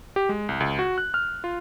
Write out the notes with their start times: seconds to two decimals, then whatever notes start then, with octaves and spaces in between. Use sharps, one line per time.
0.16 G4
0.29 G#3
0.49 C2
0.60 C#2
0.79 F#4
0.98 F#6
1.14 F6
1.44 F4